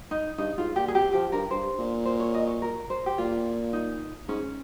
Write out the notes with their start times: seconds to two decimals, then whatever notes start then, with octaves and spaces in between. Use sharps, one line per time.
0.11 D#4
0.38 G2 D#4
0.57 G#2 F4
0.76 A#2 G4
0.88 G#4
0.94 C3 G4
1.13 F3 G4
1.32 G2 A#4
1.51 G2 C5
1.79 A#2
2.05 C5
2.19 C#5
2.34 D#5
2.47 C#5
2.62 A#4
2.90 C5
3.06 G4
3.18 A#2 F4
3.73 D#4
4.29 G#2 C#4